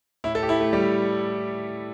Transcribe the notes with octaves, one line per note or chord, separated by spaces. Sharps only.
A2 E4
A4
G4
E4
A3
G3 G4